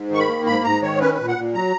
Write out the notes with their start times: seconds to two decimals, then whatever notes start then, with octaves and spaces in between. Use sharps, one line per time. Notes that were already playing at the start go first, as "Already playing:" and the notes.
Already playing: G#2
0.10 D#3 C#6
0.19 B5
0.28 A#3
0.46 G#2 B5
0.64 G#2 A#5
0.82 D#3 C#5
1.00 C#4 B4
1.14 A#2 B4
1.28 F#5
1.37 A#2
1.54 F#3 A#5